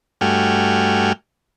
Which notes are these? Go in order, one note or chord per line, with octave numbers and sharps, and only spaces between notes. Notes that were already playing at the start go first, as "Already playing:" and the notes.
G2 A3 F#4 G5 G#5 F6